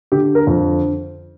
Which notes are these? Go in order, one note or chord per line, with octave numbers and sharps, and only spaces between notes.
D3 G4
A#4
F2